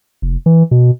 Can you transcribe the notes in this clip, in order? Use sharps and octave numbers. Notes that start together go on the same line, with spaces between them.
F1
E3
B2